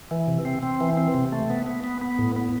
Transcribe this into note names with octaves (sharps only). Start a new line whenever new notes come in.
E3
C3
C4
C4
E3
C4
C3
A3
B3
B3
B3
B3
A2
B3